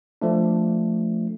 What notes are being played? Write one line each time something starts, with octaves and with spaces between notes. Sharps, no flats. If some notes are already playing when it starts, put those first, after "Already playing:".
F3 A3 D4